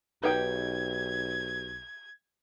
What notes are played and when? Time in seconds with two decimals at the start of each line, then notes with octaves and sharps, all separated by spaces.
0.24 B1 D#4 G4 B4 G5 G#6